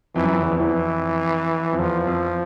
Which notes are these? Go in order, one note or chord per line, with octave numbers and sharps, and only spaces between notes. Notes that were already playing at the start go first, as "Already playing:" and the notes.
F2 E3
F#2
F2
E2
F2
E2 E3
F2
F2
E2 F3
F2